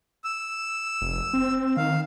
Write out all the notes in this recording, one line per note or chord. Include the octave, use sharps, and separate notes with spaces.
E6
F1
C4
D#3 F5